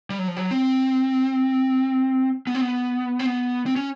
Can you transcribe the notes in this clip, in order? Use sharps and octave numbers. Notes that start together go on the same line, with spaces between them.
G3
F#3
F3
F#3
C4
B3
C4
B3
C4
B3
C4
C#4